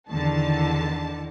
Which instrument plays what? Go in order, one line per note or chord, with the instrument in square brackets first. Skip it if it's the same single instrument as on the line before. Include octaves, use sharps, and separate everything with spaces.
[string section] E2 D3 D#3 A5